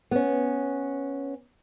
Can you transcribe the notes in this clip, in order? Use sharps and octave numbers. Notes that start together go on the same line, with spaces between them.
B3 C#4